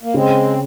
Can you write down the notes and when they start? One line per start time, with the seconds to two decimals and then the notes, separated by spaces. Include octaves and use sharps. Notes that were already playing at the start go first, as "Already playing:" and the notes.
0.03 A#3
0.14 C#3 G#3 C4